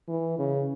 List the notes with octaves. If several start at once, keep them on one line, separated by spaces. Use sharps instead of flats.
E3
C#3